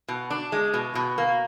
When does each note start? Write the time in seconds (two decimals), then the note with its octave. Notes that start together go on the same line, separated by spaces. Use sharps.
0.08 B2
0.30 D4
0.52 G#3
0.74 B2
0.95 B2
1.18 A#3